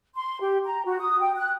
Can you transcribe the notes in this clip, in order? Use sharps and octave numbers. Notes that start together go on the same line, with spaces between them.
C6
G4
A#5
F#4
D#6
G5
F#6